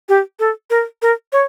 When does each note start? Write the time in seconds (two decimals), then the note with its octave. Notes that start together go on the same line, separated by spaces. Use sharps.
0.09 G4
0.39 A4
0.70 A#4
1.02 A#4
1.33 C#5